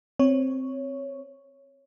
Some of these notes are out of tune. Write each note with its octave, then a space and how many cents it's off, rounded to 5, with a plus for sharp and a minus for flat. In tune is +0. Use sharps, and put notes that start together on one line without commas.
C4 +0 C#5 +0